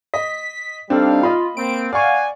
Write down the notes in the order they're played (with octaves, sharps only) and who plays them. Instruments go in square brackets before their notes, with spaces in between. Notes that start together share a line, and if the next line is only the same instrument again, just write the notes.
[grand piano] D#5 [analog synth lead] B6
[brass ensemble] G3 D#4 F5 [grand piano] C4 A4 [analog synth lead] D4
[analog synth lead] F4 [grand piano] D#5 B5
[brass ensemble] A#3 C4 [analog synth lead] D7
[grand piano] D5 C#6 [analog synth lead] F5 [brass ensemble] F#5 G#5